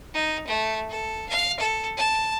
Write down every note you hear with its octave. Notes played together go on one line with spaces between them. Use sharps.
D#4
A3
A4
F5
A4
A5